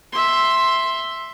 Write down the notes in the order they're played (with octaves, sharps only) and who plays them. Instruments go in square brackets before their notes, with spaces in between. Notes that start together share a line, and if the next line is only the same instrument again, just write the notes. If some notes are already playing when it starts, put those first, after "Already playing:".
[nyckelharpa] E5 C6